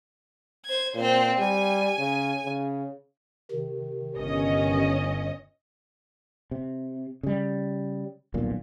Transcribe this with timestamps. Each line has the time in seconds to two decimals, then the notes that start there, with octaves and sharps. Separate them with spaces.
0.65 C5 G#6
0.95 A#2 C4 C5
1.39 G3 G#5
1.99 C#3
2.45 C#3
3.51 C3 D#3
4.15 G1 C#4 D#5
6.51 C3
7.23 C#3 G3
8.34 D#1 B1 A#2